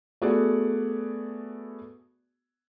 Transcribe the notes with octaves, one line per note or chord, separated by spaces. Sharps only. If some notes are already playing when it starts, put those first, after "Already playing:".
A3 B3 F#4 G#4 D5